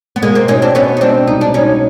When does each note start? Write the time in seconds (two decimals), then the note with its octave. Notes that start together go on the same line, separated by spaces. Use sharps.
0.16 B3
0.22 B2 G#3 A#3
0.35 A#3 C4
0.48 B2 C#4 D#4
0.62 C4 D4
0.75 B2 B3 C#4
0.97 D#4
1.01 G#3 C4 D4
1.27 C2 D#4
1.41 D4
1.54 B2 C#4 D#4